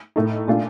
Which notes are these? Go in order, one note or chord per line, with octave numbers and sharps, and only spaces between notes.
A2 A3 D#4
A#2 A3 D4 F4